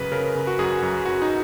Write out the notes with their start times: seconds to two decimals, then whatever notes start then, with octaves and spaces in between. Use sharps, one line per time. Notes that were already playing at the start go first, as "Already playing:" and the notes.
Already playing: F#2 C#3 B4
0.12 C#3 A#4
0.35 C#3
0.47 F#4
0.59 F#2 G#4
0.82 F#2
1.05 F#2 F#4
1.22 D#4